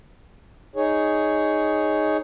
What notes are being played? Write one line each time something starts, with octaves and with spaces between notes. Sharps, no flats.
D#4 G#4 C#5